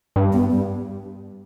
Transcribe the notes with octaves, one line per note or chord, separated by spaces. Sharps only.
G2
B3
G3